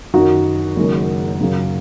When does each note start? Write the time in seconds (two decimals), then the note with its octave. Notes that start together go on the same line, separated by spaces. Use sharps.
0.14 F#2 D#3 F#3 D#4 F#4
0.76 F#1 F#2 D#3 G#3
1.40 F#2 C#3 F#3